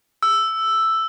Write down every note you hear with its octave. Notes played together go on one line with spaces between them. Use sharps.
E6